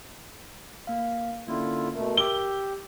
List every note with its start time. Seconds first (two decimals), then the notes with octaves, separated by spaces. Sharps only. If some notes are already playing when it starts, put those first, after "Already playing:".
0.87 A#3 F5
1.48 D3 A#3 C#4 E4 F4
1.95 B2 A3 A#4
2.17 G4 D6 E6 G7